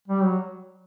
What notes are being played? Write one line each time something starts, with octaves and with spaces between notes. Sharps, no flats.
G3
F#3